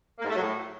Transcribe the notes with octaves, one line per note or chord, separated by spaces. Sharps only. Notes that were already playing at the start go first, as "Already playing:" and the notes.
A#3
G#2
A3
F#3
A2